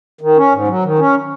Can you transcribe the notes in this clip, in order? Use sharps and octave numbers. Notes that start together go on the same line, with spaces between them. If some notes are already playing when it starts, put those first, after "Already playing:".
D#3
C#4
G#2
F#3
D#3
C#4